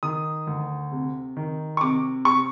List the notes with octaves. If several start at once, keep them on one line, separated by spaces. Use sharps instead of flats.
D#3 D#6
D2
C3
D#3
C#6
C3 D6
C3 C#6